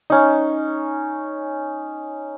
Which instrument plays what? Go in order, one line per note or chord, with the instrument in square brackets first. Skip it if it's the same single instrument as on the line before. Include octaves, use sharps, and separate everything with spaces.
[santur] C#4 D#4